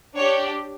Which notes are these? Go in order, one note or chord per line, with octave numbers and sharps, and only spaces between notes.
D4 G4 C#5